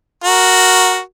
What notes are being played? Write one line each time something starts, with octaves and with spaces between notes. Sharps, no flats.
F#4 A#4